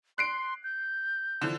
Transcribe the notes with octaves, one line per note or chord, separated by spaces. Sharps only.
C6 F#6 C7 D7
G6
D3 E3 F3